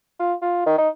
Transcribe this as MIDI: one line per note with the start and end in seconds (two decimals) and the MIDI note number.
0.20 0.33 65
0.42 0.65 65
0.66 0.74 51
0.78 0.89 63